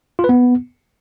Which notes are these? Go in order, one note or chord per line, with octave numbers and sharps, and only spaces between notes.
F4
B4
B3